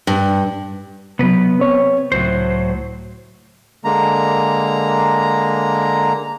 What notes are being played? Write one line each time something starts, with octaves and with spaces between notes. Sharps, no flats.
G2
C3 F#3 B3 B4
C4 C#5
C#2 A2 F#3 C5
D3 G#3 A#3 A#5